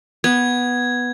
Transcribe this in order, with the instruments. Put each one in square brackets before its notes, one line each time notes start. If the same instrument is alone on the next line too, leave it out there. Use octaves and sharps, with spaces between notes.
[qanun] B3 [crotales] G#6